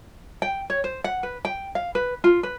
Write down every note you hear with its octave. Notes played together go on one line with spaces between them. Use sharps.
G5
C#5
C5
F#5
B4
G5
F5
B4
F4
B4